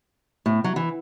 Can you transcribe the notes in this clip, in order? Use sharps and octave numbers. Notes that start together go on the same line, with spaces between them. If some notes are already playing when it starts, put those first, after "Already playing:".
A2
F#3
E3